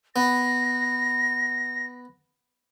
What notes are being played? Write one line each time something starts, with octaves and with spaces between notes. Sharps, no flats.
B3 A#6